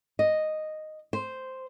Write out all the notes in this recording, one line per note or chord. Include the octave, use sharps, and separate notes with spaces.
D#5
C5